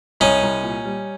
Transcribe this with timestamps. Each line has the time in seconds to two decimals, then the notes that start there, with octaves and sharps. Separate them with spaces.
0.20 C2 C#4 D#4
0.43 C2
0.63 A#2
0.85 G3